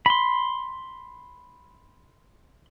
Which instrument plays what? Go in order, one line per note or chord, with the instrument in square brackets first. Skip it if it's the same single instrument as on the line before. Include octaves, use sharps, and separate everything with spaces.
[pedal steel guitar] B5 C6